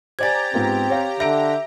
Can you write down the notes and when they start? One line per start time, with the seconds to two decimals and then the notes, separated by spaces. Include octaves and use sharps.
0.19 G4 C5 D5 G#5 A#5 G#6 A6
0.54 G#2 B3 C4 F4
0.90 C#5 F5
1.20 D3 E5 A#6 D7